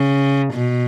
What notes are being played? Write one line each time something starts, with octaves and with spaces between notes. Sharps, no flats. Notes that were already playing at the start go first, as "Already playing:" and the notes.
Already playing: C#3
B2